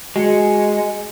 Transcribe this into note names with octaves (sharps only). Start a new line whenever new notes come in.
G#3 F#4 G#5 C#7